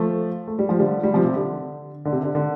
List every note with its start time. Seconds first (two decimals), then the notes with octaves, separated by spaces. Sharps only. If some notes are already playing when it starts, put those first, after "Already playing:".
Already playing: F3 A3
0.47 A3
0.59 G3
0.69 F3
0.79 D3 G3
1.03 G3
1.14 C3 F3
1.25 C3
1.36 D3
2.05 D3
2.13 C3
2.24 D3
2.35 D3